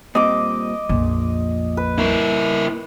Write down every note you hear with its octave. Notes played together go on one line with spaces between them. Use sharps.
A#2 G3 C4 D#5 D6
A#1 F2 A#2
B4
E4 A#4